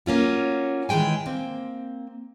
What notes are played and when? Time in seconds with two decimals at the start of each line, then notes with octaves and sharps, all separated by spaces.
0.06 A#3 C#4 F4 F#4
0.89 D#3 E3 G#3 G5 G#5
1.26 A#3 C4